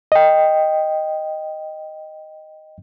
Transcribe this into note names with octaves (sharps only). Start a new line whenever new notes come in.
D#5 G5